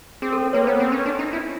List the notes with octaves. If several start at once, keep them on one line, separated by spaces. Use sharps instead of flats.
C4 G#4
A4
A#4
A#3 B4 C#5
B3 C5
C4
C#4
D4
D#4
E4